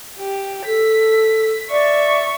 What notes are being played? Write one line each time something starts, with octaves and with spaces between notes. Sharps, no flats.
G4
A4 B6
D5 E5 C#6